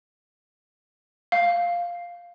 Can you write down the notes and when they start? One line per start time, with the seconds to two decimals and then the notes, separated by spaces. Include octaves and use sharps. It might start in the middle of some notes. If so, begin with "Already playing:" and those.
1.32 F5